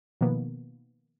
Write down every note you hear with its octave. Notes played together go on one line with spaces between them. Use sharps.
B2 D#3 F3 A#3 B3